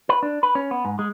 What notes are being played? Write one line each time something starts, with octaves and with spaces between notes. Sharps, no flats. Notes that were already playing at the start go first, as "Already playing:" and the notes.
B4
D4
B4
C#4
B3
G#2
G#3